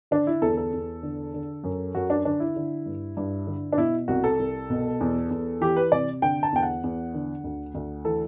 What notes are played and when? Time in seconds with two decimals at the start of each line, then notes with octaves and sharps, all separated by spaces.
0.11 D3 D4
0.27 E4
0.41 E2 A4
0.57 A4
0.73 E2
1.03 D3
1.34 D3
1.64 F#2
1.95 F#2 F#4
2.10 D4
2.25 D3 D4
2.40 E4
2.56 D3
2.86 G2
3.17 G2
3.47 D3
3.73 D4
3.77 B2 E4
4.08 C2 F#4
4.24 A4
4.39 C2
4.70 B2
5.01 E2
5.30 E2
5.61 E3 G4
5.76 B4
5.92 C3 D5
6.22 D3 G5
6.43 A5
6.53 E2 G5
6.63 F#5
6.84 E2
7.14 D3
7.44 D2
7.74 D2
8.05 E3 A4